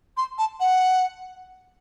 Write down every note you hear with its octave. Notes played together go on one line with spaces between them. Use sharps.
C6
A5
F#5